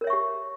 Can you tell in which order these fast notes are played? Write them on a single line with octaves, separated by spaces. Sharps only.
A#4 C#5 E5 C#6 G4